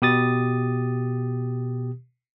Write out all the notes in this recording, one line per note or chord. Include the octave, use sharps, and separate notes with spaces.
B2 G4 D#6 A6